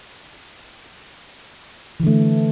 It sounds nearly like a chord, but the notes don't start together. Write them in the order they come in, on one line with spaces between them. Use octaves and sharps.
E3 D3 A3